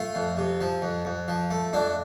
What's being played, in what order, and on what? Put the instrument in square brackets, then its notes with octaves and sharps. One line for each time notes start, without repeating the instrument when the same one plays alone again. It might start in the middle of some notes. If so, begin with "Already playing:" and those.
Already playing: [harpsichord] A3 F4
F2
C3
F3
F2
F2
F3
A3
F2 D4